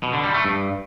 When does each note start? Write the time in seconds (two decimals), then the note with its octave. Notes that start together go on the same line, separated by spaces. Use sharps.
0.03 B2
0.13 D3
0.24 G3
0.34 A3
0.45 G2